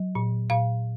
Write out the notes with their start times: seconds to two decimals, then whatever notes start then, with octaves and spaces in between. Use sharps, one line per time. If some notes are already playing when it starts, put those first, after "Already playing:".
Already playing: F#3
0.15 A#2
0.50 A#2 F5